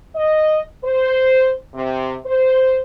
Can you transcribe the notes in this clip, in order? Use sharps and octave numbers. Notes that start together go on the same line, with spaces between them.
D#5
C5
C3
C5